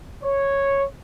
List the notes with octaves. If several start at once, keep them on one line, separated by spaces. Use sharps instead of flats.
C#5